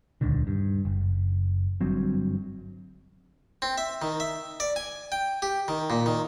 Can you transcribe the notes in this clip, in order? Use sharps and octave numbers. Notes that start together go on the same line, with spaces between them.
D#1 C#2 D3 D#3
G2
F#1
G1 G2 F#3 C4
C4
E5
D#3
E5
D5
G#5
G5
G4
D#3
A#2
D#3